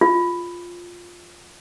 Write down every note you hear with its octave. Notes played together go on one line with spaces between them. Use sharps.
F4